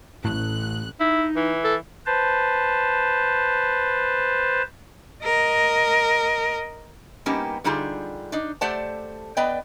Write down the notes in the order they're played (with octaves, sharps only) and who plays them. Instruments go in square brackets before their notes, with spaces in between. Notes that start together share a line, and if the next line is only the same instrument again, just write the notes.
[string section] A1 F#6 [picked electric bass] A2
[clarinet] D#4 [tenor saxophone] E4
[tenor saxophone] E3
[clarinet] A4
[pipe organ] B4 C5 A5
[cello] A#4 D#5
[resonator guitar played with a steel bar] G3 A#3 B3 C#4 D#4 G4
D3 G3 D#4 F4 G4 G#4
D4 D#4
A3 G4 C5 D5 F#5 A5
B3 B4 D5 D#5 G5